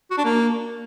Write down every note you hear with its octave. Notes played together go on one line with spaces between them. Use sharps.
F#4
D4
A#3